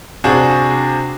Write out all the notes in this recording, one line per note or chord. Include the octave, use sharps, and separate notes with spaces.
C3 D4 F#4 G#4